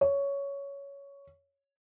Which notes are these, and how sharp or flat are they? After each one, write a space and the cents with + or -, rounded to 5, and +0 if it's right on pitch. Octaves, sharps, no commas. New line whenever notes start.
C#5 +10